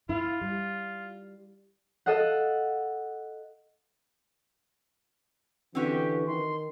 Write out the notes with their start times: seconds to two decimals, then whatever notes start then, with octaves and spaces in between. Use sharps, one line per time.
0.09 E4 F4
0.41 G3
2.06 A4 D#5 F5 F#5
5.75 D3 E3 C4 C#4 F#4 G4
6.27 D#3 C6